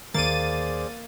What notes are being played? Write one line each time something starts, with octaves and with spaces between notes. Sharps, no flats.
D#2 D#3 A#3 G#4 C5 D5 A6 D#7